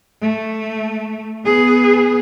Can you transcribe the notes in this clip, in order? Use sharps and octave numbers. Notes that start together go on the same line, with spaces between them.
A3
B3 G#4